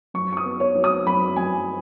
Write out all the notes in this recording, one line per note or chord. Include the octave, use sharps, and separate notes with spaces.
F#2 C#6
C#6
D#6
B3
C#5
F#3
D#6
F#2 B5
F#2 G#5